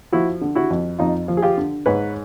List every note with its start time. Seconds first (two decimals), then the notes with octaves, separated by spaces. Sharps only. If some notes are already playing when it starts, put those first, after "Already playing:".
0.12 F3 E4 F#4
0.41 D3
0.55 E4 F#4
0.70 F2
0.99 F2 D#4 F4
1.28 F3
1.37 G#4
1.42 F4 G4
1.57 D3
1.86 G#2 B4 C#5